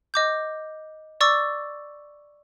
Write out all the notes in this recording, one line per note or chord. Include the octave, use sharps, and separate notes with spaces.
D#5 D6 G6
D5 C#6 D6 E6 A6